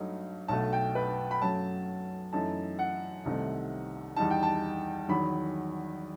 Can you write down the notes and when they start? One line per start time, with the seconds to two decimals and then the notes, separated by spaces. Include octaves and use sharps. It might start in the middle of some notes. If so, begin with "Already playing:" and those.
Already playing: G2 F#3 A3 D#4
0.48 B1 B2 A3 A5
0.73 G5
0.95 B4
1.31 B5
1.41 F#2 F#3 A3 A5
2.33 F#2 E3 A3 D#4 A5
2.79 F#5
3.25 C2 C3 D#3 A3 D#4
4.16 E2 D#3 G3 D#4 A5
4.30 G5
4.43 A5
5.09 E2 D#3 F#3 B5